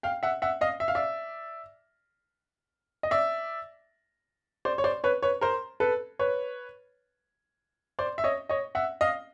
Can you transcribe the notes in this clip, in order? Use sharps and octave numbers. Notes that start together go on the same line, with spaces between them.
F5 G5
E5 F#5
E5 F#5
D#5 F5
E5
F5
D5 E5
D#5
D5 E5
C5 D5
C#5
C5 D5
B4 C#5
B4 C#5
A#4 C5
A4 B4
B4 C#5
C5 D5
E5
C#5 D#5
C#5 D#5
E5 F#5
D#5 F5